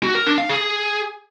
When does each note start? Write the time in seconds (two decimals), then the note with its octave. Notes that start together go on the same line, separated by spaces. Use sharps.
0.03 F#4
0.15 A#4
0.26 D4
0.38 F5
0.49 G#4